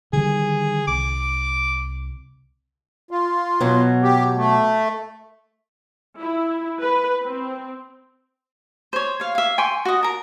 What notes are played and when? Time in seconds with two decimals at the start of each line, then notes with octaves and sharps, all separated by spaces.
0.13 D3 D#3 G3 G#4
0.87 C2 D6
3.11 F4
3.61 B2 F#3
4.02 G4
4.37 A3
6.20 E4
6.81 B4
7.24 C4
8.93 C5 C#5
9.20 C#5 F5
9.35 E5 F5
9.58 G5 G#5 C6 C#6
9.85 F#4 D#5
10.03 A#4 A#5